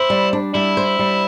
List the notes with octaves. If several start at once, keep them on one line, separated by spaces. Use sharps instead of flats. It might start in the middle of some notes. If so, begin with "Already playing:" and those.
Already playing: E4 C5
G3
D4
G3 E4
C5
G3